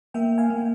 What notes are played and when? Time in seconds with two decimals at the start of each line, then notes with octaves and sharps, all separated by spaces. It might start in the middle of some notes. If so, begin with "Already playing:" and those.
0.14 A#3 E5 G5
0.38 F5 G#5
0.50 A#3